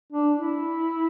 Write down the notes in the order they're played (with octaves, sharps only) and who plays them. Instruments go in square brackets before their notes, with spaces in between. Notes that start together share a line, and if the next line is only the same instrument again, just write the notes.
[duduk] D4
E4